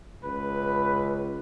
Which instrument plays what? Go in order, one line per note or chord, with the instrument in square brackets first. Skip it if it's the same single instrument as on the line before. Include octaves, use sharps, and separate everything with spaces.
[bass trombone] C#2 [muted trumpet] B4